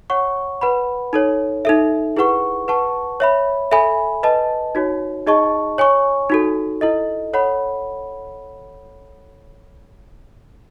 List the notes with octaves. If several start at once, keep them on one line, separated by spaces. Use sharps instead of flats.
C#5 F#5 C#6
B4 F#5 B5
D#4 A4 C#5
D#4 A4 E5
E4 G#4 B4 F#5 C#6
B4 F#5 A5 C#6
C#5 E5 B5
A4 E5 G#5 B5
B4 D#5 A5
D#4 F#4 C#5
D#4 G#4 D#5 A5 C#6
C#5 G#5 C#6
D#4 F#4 A4
E4 A4 D#5
A4 C#5 F#5 B5